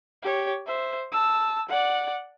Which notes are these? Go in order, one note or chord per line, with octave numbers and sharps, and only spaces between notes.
G4 C#5
C5 E5
A5 E6
D5 F#5